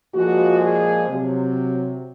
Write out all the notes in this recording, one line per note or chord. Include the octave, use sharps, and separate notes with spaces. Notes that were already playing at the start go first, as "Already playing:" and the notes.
A#2 F3 G#3 F#4
G#4
C3 F#3